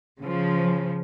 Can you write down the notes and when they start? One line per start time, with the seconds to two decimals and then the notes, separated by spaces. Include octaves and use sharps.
0.21 C#3 F3